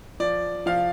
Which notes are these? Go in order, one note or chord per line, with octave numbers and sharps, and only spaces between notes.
F3 D5
F3 F5